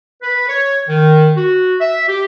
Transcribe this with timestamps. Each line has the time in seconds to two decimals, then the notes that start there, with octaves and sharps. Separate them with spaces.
0.22 B4
0.48 C#5
0.89 D#3
1.36 F#4
1.80 E5
2.07 G4